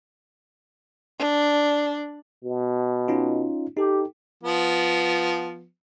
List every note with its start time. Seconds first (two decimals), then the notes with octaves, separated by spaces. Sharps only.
1.19 D4
2.44 B2
3.08 C#4 D#4 F4
3.77 D#4 G4 A4
4.44 F3 B3